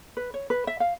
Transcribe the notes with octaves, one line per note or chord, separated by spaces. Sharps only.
B4
C#5
B4
E5
F5